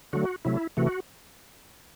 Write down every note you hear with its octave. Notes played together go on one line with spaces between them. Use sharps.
D3 F#3 A3 F#4
C3 F#3 A3 E4
C3 E3 A3 F#4